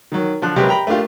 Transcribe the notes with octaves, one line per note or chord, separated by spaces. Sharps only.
D#3 F#3
D3 F3 D4 F#6
C3 F#3 G#3 G4 A#4 B4
G5 A#5 B5
A3 A#3 D4 F4 G4